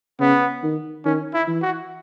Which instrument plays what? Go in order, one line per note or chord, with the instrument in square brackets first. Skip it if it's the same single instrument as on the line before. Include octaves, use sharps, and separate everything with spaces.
[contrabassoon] C#3 [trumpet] B3
[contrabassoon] D#3
[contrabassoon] D#3 [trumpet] C#4
[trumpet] E4
[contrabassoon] E3
[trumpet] F#4